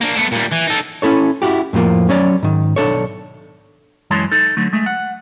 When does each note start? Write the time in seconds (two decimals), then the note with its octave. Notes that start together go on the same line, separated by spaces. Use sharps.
0.01 A#3 D4
0.18 A3 B3
0.32 A#2 G3
0.52 E3
0.67 D#4 A4
1.02 C#4 E4 A4 C#5
1.42 E4 F#4 G4
1.73 F2 A2 E3 F3 A#3
2.09 F#3 C#4 C#5 D5
2.43 G#2 D#3
2.76 B1 D4 A4 C#5
4.10 F#2 E3 G#3 C#5 A5 C6
4.31 D#4 A4
4.57 D3 F#3 A3
4.73 G#3 A3
4.86 F#5